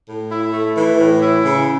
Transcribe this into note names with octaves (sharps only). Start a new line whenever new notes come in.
A2
E4
A3
E3
A2
E4
C#3